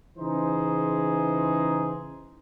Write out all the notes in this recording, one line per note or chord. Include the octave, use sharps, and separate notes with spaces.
C#3 E3 D#4 G#4 C5